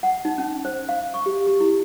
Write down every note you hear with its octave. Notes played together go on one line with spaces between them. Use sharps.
F#5
D#4
C#4
C5
F5
C#6
G4
G4
E4